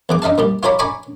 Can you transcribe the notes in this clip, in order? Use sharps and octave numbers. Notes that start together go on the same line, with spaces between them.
E2 E3 D6
D4 D#4 E5 F5 A5
A#2 G3 G4
F4 G4 C#5 D5 A#5 B5
D5 G#5 A#5 B5 C#6 D6